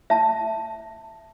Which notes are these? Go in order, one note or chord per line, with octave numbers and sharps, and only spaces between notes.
E5 A5